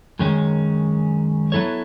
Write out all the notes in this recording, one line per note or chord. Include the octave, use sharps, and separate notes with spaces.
F#2 D#3 G#3 C#4
F#3 B3 E4 A4 C#5